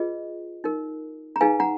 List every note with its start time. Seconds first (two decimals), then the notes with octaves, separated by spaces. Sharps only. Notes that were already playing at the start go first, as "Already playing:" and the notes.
Already playing: F4 G#4 B4 D#5
0.64 D#4 A#4
1.36 A#5
1.41 D#4 G#4 B4 F5 G#5
1.60 F#5 A#5